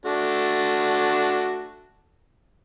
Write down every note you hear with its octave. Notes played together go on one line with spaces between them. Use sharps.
A3 D4 F#4